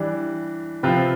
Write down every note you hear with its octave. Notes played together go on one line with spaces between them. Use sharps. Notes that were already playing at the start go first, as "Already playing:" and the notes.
Already playing: E3 G3 D4
C3 F3 C4 F4 B4